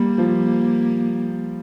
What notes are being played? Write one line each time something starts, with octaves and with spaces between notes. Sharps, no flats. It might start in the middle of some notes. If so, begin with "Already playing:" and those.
Already playing: G3 A#3
F3